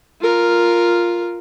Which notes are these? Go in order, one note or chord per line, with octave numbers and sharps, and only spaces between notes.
F4 A#4